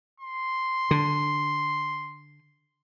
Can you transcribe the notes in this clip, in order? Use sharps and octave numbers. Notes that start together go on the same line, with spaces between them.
C6
D3